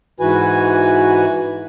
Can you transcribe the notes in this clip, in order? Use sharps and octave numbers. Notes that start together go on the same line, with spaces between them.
G#2 E3 F#4 B4 G#5